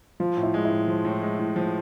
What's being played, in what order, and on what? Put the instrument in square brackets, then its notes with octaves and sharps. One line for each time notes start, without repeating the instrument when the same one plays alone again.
[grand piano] F3 [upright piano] F4
[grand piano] A2
[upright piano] E4
[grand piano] G#3
[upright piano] E4
[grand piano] A2
F3
A2
G#3
A2
F3